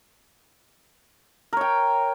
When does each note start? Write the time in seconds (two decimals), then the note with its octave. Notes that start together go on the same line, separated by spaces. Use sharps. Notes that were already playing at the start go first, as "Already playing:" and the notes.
1.53 A#4
1.57 C#5
1.61 G5